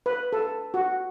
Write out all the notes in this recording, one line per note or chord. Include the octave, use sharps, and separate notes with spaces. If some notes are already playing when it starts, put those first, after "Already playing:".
B4
A4
F#4